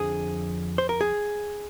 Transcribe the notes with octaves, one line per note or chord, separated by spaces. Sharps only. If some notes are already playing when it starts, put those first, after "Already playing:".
Already playing: F2 D3 F3 G#4
C5
A#4
G#4